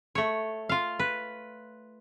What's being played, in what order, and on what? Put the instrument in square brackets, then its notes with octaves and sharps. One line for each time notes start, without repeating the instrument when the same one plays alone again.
[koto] A3 C#5
F4 F5
B4